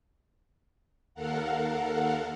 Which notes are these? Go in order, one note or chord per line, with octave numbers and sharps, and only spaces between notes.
D#2 A4 A#4 F5 F#5